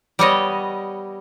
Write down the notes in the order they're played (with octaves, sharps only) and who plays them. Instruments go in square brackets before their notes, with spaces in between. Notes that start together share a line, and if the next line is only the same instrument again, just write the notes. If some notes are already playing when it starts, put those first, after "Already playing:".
[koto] G3 B3 C#5 D#5